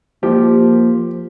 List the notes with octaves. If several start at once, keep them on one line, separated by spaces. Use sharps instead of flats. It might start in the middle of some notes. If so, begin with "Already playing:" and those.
F3 A#3 G4